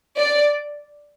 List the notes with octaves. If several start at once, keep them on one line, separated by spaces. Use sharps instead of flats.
D5